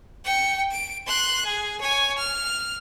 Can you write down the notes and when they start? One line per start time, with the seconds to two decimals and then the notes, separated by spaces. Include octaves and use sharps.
0.25 G5 C#7
0.71 D7
1.07 C6 F#6
1.45 G#4
1.81 C#5 G#5
2.18 F6